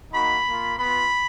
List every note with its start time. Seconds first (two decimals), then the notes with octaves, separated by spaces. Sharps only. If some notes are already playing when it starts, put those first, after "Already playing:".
0.12 A#3 D#4 F#4 B5
0.46 A#3 F4
0.78 B3 F4 B5